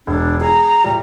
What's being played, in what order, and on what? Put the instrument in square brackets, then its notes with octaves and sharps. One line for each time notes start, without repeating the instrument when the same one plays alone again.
[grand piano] E1 [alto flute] D4
[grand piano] G#4 [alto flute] A#5
[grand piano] A2 G3